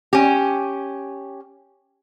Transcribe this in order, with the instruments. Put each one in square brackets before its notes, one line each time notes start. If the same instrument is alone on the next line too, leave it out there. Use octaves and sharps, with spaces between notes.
[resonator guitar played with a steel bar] C#4 G4